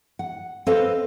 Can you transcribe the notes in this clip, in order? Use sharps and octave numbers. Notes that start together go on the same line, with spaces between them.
F#5
C4 A4 B4 C5 D#5 F5